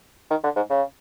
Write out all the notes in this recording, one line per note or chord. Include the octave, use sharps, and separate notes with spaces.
D#3
D3
G#2
C#3